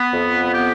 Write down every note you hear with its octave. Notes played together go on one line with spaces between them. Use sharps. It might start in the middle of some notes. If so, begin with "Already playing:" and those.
Already playing: B3
F2
B3 G4